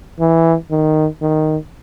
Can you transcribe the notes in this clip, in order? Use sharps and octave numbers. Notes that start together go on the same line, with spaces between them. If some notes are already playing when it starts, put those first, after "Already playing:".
E3
D#3
D#3